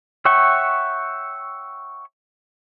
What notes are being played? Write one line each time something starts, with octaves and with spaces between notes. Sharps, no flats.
C#5 E5 F#5 G5 C#6